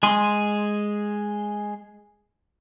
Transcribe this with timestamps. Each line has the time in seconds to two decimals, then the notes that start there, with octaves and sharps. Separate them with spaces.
0.03 G#3 G#4 C6